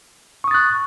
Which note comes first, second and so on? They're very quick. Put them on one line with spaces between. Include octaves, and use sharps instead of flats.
C#6 D#6 A6 F#6